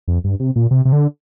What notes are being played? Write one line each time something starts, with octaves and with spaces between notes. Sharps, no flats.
F2
G2
C3
A#2
C3
C3
D3